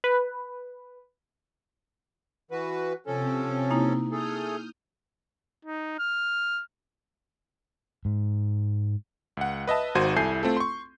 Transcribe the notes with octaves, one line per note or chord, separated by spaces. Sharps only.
B4
E3 F#4 B4
C3 F3 C4 C#4 A4
A#3 D#4 E4
A3 G#4 A4 D#6 F6 G6
D#4
F6
G#2
C#2 F#5
B4 D#5 E5 A5
G#1 D#3 F#4 C5 G#6 D#7
C2 E4 A4 G#5 G6 C7
A3 C4 F4 A4
C6 C#6